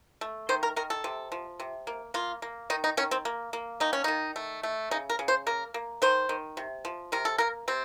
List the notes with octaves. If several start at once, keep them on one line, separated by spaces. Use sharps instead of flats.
A3
D#3 C5
A#4
D#3 A#4
A4
C3
F3
C3
A#3
A#3 F4
A#3
D#3 D#4
D#4
D#3 C#4
C4
A#3
A#3
D#3 D#4
C#4
D#3 D#4
A3
A3
C#3 D#4
A#4
C#3
C5
A#3 A#4
A#3
D#3 C5
D#3
C3
F3
C3 A#4
A4
A#3 A#4
C3 C4